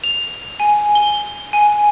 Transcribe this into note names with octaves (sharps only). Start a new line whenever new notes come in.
F7
G#5
G7
G#5